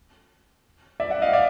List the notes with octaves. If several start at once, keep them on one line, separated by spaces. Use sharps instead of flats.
D5 E5
E5 F#5
D#5 F5
D5 E5